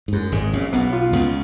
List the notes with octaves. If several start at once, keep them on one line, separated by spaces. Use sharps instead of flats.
G#2
F#2 G#3
G#1 G#2 G#4
A#1 A#2 C#4
B1 B2 B3
F4
C#2 C#3 B3